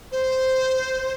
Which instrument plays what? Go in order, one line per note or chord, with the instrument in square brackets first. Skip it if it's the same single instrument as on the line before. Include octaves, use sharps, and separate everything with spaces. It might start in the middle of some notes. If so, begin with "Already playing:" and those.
[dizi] C5